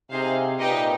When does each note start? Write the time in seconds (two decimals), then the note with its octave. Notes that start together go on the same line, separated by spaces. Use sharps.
0.11 C3 D#4 G#4 C5 F5
0.59 A#2 D#4 G4 B4 D#5